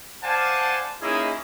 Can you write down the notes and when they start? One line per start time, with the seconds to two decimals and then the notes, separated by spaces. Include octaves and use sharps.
0.23 C5 D5 F5 F#5 G#5 A5
1.01 A#3 C#4 D#4 E4 G#4 D#5